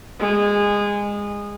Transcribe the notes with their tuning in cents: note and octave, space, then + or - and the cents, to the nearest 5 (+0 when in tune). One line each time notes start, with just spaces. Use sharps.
G#3 -20